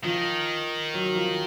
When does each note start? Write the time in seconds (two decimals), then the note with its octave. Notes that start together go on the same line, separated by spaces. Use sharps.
0.04 D#3 F3
0.94 F#3
1.16 F3